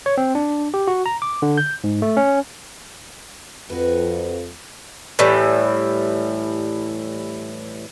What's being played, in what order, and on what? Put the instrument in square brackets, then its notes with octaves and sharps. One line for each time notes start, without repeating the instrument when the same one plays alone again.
[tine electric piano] C#5
C4
D4
G4
F#4
A#5
D6
D3
G6
G#2
A3
C#4
[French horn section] F2 [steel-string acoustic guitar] F#4 B4
[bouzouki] A2 E3 G3